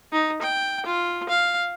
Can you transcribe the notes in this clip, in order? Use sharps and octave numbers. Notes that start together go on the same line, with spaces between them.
D#4
G5
F4
F5